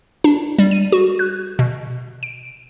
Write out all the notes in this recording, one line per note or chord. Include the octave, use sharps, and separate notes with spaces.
D4
G3
D#7
F#4
F#6
B2
D7